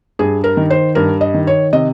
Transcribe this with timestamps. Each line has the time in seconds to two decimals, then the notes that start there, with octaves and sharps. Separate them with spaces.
0.19 G2 G#4
0.44 A#4
0.57 D#3
0.70 C5
0.95 G2 A#4
1.21 D#5
1.34 D#3
1.47 C#5
1.73 C3 D#5